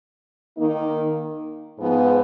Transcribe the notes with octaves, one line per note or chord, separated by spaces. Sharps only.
D#3 A#3 D#4
G#2 F3 B3